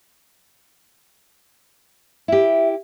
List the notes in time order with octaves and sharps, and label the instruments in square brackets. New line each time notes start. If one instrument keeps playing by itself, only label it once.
[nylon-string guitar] E4 G4 [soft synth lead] E5